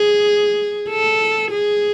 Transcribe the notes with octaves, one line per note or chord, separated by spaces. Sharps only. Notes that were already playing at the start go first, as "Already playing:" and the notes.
Already playing: G#4
A4
G#4